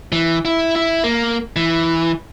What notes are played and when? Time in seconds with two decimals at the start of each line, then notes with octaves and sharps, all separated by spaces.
0.12 E3
0.45 E4
0.76 E4
1.04 A#3
1.56 E3